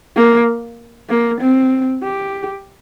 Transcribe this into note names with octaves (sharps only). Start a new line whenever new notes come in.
A#3
A#3
C4
G4